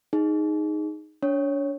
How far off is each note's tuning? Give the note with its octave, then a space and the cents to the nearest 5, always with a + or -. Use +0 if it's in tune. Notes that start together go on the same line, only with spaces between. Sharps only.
D#4 +0 G#4 +0
D4 -35 C#5 -5